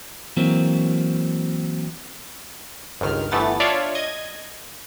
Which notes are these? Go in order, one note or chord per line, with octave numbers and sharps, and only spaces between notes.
E3 F#3 A#3 C4
G1 C#2 D#3 F6
G1 E3 A3 B3 A6
D4 F4 C#5 D5 E5 F5
D#5 G#6